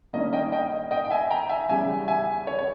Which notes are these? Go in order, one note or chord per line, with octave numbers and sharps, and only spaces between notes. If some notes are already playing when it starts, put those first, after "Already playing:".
G2 D#3 A#3 C#4 D#5
D#5 G5
D#5 G5
D#5 G5
G5
E5 G#5
G5 A#5
E5 G#5
E2 C#3 G3 E5 G#5
E5 G#5
C#5
C#5